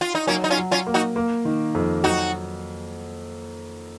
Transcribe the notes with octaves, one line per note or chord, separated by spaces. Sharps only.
F4
D#4
F#3 A#3 C#4
D#4
C#4 F4
F#3
C#4 F4
A#3
D#4 F#4
A#3
D#3
F2
F#3 D#4 F#4